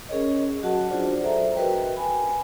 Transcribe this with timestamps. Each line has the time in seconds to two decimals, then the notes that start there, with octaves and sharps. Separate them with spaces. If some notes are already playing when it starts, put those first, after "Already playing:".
0.09 C#4 G#4 A#4 C#5 D#5
0.63 F#3 F#4 G#4 D#5 F#5 A5
0.90 D4 F4 F#4 C5 D5
1.21 F#3 G#4 A4 C5 E5 A#5
1.56 F#4 A#4 B4 D#5 G5
1.96 G#5 B5